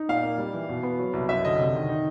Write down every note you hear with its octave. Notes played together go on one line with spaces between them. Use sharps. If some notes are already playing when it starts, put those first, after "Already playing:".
Already playing: D#4
A#2 F5
A#3
G3
E3
B2
B3
F#3
C2
F#2 E5
D3 D#5
C3
D#3
D#4